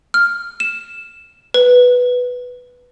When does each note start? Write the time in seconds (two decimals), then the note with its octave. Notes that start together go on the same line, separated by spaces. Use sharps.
0.14 F6
0.60 E7
1.54 B4